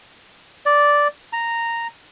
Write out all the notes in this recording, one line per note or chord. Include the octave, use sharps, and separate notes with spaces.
D5
A#5